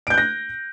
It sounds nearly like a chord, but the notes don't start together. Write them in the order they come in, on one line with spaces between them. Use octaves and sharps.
D7 G6 F#6 A#6